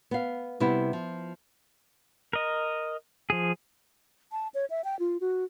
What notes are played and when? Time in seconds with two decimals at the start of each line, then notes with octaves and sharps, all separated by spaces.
0.11 B3 F5
0.60 C3 G3 B3 E4
0.93 F3
2.33 A#4 D#5
3.30 F3 G#4
4.32 A5
4.54 C#5
4.70 E5
4.84 G5
5.00 F4
5.21 F#4